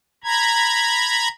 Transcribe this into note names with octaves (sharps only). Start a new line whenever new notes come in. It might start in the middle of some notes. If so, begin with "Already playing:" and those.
A#5 B5 G#6